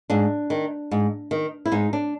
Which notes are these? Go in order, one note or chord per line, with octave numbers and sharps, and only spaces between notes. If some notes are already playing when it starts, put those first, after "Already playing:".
G#2 D4
D#3
G#2
D#3
E4
G#2 D#4
D4